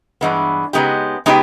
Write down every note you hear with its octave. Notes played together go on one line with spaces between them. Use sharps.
G2 E3 G#3 B3
C#3 G#3 B3 D#4 G4
C#3 G#3 B3 D#4 G4